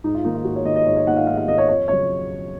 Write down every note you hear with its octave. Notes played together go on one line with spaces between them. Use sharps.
G#2 D#4
F4
D#3 A#3 D#4
F4
G#2 F#4
C#5
D#3 A#3 D#5
D#5
G#2 C#5
C#5
D#3 A#3 F#5
F5
G#2 F5
F5
D#3 A#3 D#5
C#5
F2 C#5
C#3 F#3 C#5